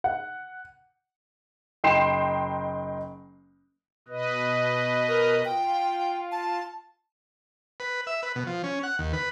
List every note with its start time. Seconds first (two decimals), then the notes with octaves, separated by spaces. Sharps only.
0.04 F#5
1.84 F#1 D#4 G5 C6 C7 E7
4.08 B2 B4 D#5
5.08 A#4
5.45 F4 G5
6.32 A5
7.80 B4
8.07 E5
8.23 B4
8.36 B2
8.47 F3
8.64 C#4
8.83 F#5
8.99 D#2
9.13 B4